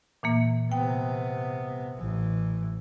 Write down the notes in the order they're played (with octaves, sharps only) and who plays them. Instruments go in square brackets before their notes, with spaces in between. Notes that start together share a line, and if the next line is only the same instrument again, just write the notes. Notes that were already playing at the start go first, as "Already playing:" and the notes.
[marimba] A#2 E3 A#3
[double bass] C3 B3 [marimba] G5
[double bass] A1 E3